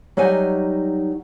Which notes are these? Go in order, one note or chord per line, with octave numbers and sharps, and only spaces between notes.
F#3 G3 D#4 F#5 G#5